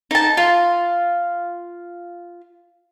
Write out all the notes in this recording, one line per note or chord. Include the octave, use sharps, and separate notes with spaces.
D#4 A5
F4